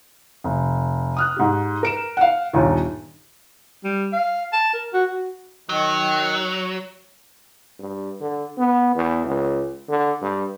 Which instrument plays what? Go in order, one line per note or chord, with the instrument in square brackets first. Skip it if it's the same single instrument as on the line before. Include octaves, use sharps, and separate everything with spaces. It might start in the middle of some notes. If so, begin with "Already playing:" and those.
[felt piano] F1
D#6 F6 F#6
G#2 G4
A#4 D7 E7
F5 F#5
G1 D#2 A#2 D#3
[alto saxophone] G3
F5
A5
A#4
F#4
F#4
[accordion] D#3 [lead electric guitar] F#3
[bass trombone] G2
D3
B3
E2
C#2
D3
G2